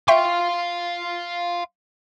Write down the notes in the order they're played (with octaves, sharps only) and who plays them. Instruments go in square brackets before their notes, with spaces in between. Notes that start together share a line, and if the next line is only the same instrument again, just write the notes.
[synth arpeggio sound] E5 G5 C#6 [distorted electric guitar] F5 C6